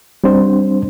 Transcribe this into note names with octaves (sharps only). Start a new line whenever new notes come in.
G3 C4 D4 C5